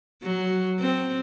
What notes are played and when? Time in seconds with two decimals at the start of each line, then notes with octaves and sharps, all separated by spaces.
0.23 F#3
0.80 C4